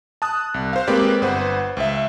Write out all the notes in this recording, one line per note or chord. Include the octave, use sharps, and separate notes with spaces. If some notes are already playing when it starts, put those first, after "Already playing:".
A5 D#6 F#6
C2
C5 F5
G#3 A#3 C4 G4 B4 D5
G1 B4 C5 F#5
C#2 E5